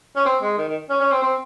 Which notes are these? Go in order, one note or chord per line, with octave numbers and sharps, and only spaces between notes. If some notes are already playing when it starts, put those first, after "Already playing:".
C#4
C4
G#3
D#3
D#3
C#4
C#4
C4
C4